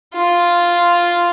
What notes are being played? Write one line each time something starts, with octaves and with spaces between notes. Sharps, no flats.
F4